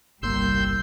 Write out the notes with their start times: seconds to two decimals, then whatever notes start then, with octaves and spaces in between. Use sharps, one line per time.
0.22 G1 C2 G3 A#3 C6 E6 G6